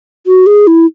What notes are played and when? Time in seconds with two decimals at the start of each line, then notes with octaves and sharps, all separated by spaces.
0.27 F#4
0.46 G#4
0.67 E4